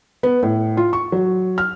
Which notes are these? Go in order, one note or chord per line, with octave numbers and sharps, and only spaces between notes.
B3
A2
F4
C#6
F#3
F6